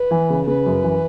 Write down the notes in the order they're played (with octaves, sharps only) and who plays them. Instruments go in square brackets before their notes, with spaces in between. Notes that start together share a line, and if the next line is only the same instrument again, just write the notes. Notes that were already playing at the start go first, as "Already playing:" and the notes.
Already playing: [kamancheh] B4
[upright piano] E3
C#3
[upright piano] C#3 [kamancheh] B4
[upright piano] F#2
E3